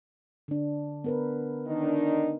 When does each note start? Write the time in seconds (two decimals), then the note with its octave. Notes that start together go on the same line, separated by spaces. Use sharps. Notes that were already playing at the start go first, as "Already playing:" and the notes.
0.48 D3 D4
1.04 B3 A#4 B4
1.67 D#3 D4 D#4